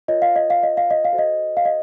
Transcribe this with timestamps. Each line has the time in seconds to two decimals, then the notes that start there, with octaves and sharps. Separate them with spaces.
0.08 F4 A#4 C#5 D#5
0.22 F5
0.36 D#5
0.50 F5
0.63 D#5
0.77 F5
0.91 D#5
1.05 F5
1.13 F#4 A4 C5
1.18 D#5
1.57 F5
1.65 D#5